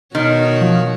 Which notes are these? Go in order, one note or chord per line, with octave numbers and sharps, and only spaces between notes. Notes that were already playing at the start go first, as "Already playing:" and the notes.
B2 D#3 F#4 C#5
F3